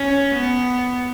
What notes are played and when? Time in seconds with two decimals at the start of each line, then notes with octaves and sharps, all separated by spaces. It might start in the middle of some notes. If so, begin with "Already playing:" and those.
Already playing: C#4
0.35 B3